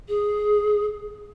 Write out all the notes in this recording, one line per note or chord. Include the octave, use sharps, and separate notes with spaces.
G#4